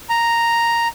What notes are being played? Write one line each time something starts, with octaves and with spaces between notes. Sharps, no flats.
A#5